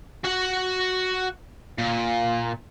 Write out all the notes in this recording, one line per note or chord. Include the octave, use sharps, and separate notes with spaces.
F#4 F#5
A#2